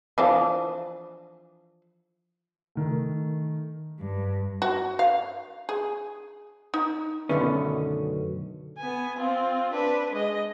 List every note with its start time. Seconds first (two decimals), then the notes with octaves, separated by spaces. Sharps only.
0.18 E3 F3 D4
2.75 D#3 A3
3.99 G2
4.62 F#4
4.99 F5
5.69 G#4
6.74 D#4
7.29 F#2 B2 D3 D#3 A3 C#4
8.78 B3 G#5
9.18 C4 F4
9.73 D4 B4
10.14 G#3 D#5